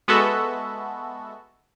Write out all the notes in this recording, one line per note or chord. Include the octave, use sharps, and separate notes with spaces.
G#3 B3 F#4 A4 E5